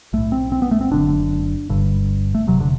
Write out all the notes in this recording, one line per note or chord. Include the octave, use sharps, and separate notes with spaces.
B1 A2 A3
C4
C4
B3
A3
C4
F#1 F#2 D3 D4
G1 G2 D3
A3
E1 D2 C3 F#3
D3